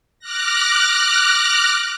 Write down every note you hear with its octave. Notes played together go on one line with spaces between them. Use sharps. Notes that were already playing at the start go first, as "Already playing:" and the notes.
D6 F6 F#6 A#6